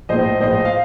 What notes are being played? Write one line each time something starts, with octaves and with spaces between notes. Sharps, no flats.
A#1 A2 C5 D#5
A#1 A2 C5 D#5
F5